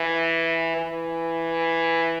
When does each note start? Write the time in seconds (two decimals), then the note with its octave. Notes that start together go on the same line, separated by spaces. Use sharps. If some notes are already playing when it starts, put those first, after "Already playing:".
Already playing: E3
0.77 E3